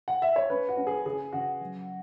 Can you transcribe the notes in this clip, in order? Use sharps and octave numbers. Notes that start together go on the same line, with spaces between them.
F#5
E5
C#5
C#4 B4
F#4
C#4
G#4
C#3 G#4
C#3 F#4
F#3